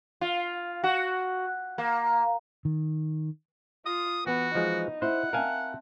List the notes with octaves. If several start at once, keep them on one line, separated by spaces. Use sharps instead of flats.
F4
F#4
A#3
D#3
F4 D#6
E3 B3 F#4
F3 G#3 D#4
E4 C5 F#5
C4 A#4 E5 F5 G#5 A5